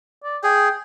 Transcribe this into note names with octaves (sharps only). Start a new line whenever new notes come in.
D5
G#4 G5